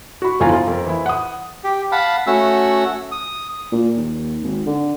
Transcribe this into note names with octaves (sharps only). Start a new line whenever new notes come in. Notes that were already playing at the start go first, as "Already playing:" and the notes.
F#4 B5
G1 F2 E3 F4 G#5 A#5
F4
F2 A#4
E3 E4
F#5 D#6
G4
F5 F#5 A5 B5
A3 C#4 F#4 F#5 E6
D#6
A#2
D#2
G#1
D3